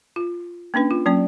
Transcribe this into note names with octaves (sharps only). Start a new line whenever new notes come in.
F4
A#3 C#4 D4 B4
F4
F#3 A#3 C#4 D5